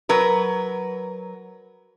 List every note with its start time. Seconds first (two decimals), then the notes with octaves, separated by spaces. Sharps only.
0.09 F#3 A#4 B4